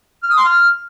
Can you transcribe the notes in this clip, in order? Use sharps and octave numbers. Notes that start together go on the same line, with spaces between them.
F6
D#6
C6
F6